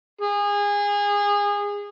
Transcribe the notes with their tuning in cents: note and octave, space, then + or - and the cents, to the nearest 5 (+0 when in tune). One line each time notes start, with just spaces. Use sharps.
G#4 -25